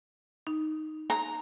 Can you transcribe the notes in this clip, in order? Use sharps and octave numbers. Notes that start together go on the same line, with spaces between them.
D#4
A#5